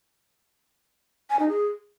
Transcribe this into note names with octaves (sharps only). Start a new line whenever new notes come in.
G#5
D#4
G#4